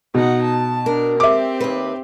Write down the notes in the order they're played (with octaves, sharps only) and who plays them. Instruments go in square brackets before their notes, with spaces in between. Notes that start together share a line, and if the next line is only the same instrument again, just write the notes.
[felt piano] B2 [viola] D#4 F#5
[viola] A5
[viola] D4 [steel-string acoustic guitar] A#4
[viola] C4 G4 [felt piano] E5 D6
[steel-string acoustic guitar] D#2 B4